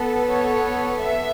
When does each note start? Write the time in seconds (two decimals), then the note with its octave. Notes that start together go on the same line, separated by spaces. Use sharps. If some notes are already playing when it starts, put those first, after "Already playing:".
Already playing: B3 A4
0.30 C#5
0.98 E5